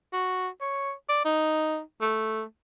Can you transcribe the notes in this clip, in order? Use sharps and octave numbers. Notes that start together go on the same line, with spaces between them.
F#4
C#5
D5
D#4
A3